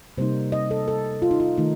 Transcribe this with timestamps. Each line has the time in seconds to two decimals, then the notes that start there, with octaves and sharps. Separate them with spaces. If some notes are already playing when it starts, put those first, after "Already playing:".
0.18 C3 G3 A#3 D#4 C5
0.52 D#5
0.71 A4
0.88 A4
1.22 F4
1.31 D#4
1.40 F4
1.58 D#3 A3 D#4